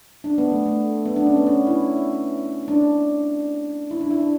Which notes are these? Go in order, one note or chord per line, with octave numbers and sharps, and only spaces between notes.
D4
B3
A3
A3
B3
D4
C#4
B3
C#4
E4
D4
E4
D4
E4
D4